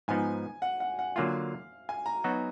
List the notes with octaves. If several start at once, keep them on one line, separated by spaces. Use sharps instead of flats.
G#2 F3 B3 D#4 G#5
F#5
F#5
F#5
D3 F#3 A#3 F4 F5
G#5
A#5
F#3 B3 D#4 F#4